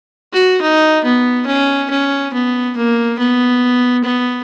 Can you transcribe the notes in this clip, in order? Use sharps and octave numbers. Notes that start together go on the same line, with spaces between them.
F#4
D#4
B3
C#4
C#4
B3
A#3
B3
B3